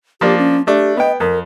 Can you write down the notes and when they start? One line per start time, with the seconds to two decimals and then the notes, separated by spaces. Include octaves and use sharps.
0.21 F3 A#3 D4 G4
0.39 C#4
0.67 A3 D4 G4
0.97 B3 D#5 G5
1.20 F2 A#4